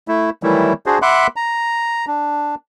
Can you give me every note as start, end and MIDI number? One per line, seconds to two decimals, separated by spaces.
0.08 0.30 57
0.08 0.30 64
0.43 0.73 51
0.43 0.73 52
0.43 0.73 54
0.43 0.73 55
0.43 0.73 57
0.43 0.73 64
0.86 0.99 62
0.86 0.99 66
0.86 0.99 68
0.86 0.99 72
1.02 1.27 76
1.02 1.27 78
1.02 1.27 83
1.02 1.27 84
1.02 1.27 86
1.02 1.27 90
1.36 2.05 82
2.07 2.55 62